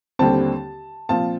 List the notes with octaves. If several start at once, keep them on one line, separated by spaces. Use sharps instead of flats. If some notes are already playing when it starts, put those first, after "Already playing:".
D#2 D3 G3 C4 A5
A#2 F3 C4 F4 A5